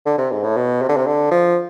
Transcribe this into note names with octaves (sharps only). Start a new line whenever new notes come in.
D3
C3
G#2
A2
B2
C3
D3
C3
D3
F3